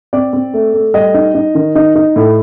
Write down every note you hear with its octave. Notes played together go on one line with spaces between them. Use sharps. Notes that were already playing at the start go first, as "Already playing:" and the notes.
C4 D5
C4
A3
A3
G3 D#5
D#4
D#4
D#3
D#4
D#4
A2